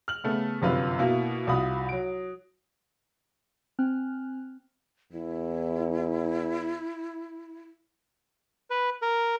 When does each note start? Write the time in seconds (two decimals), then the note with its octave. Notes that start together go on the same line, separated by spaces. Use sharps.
0.08 F6 F#7
0.24 C#3 A3 B3
0.62 G1 F#2 C3 F4 B4 F5
0.99 B2 A#3 E4
1.47 C2 F4 F#4 B5 D#6
1.89 F#3 D7
3.79 C4 G5 G#5 F6 F#6
5.12 E2 E4
8.70 B4
9.02 A#4